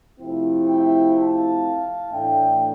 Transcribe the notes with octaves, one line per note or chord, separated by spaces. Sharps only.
C3 F3 A3 C4 E4
E5 G5
F5 A5
A2 E3 A3 D4 E5 G5